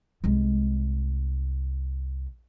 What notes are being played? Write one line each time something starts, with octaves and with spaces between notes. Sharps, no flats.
C2 G#3